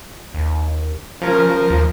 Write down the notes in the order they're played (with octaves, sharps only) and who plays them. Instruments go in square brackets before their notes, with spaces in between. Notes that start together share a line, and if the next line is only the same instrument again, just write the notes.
[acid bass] D#2
[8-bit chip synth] F3 A#4 [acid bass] C#4
[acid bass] D#2